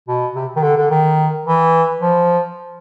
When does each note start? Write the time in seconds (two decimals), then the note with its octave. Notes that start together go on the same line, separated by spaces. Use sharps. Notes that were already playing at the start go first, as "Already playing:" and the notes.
0.08 B2
0.35 C3
0.56 D#3
0.63 D3
0.77 D3
0.90 D#3
1.45 E3
2.01 F3